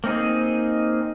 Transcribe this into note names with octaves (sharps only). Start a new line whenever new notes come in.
A#3 C4 D#4 G#4